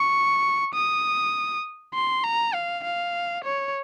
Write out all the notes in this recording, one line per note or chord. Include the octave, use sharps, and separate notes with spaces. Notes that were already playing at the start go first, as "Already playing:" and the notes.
Already playing: C#6
D#6
C6
A#5
F5
F5
C#5